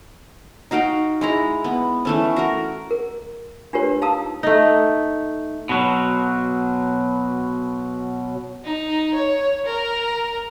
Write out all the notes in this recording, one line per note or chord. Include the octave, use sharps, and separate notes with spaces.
D#4 F#4 F5 G5
G#3 E4 A#5
B3
E3 A3 C#4
F#4 A#4
A#4
D4 F4 G4 A#4 B4 C#5
D#4 F5 A5 A#5 D#6 E6
A3 D#4
B2 F#3
D#4
C#5
A#4